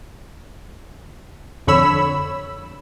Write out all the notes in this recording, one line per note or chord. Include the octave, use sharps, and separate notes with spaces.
F2 D3 C#5 B5 E6